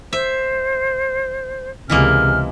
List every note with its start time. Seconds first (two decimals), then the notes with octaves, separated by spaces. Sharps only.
0.13 C5 E5
1.90 C#2 C3 E3 G#3 A#3 F6